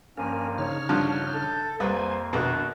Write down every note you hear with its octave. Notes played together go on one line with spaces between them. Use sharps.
G2 F3 A#3 C#4 A#4 G#5
C#3 D#4 C#5 F6
G2 D3 F3 G6
A4
C2 F2 A#3 B4 C5 G#5
A#1 B2 D4 F#4